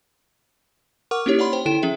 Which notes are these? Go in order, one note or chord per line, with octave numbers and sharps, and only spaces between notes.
A#4 F#5 C#6 D6 F6
A#3 C#4 D#4 E4 G4 C#5
C#5 D5 F#5 B5 C6
C5 G5
D3 E4 A4 G5 D7 E7
F3 C#4 G#4 E5